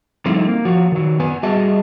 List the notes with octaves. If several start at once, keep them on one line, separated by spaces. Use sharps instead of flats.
F3 G3 A3 C4 D#4 E4
A#3
F3 F#4
D#3 F#3
B3 B4 G#5
G3 F#4 G#4 D#5 E5 A5